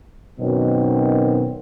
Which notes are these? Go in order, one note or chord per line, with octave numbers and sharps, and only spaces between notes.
F#2 B2 D#3 F#3 C4